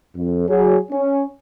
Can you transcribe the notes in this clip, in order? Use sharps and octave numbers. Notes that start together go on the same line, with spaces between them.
F2
F#3 G#4
C#4